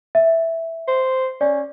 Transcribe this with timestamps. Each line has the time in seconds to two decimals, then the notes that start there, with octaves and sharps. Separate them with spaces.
0.15 E5
0.88 C5
1.41 C#4 D5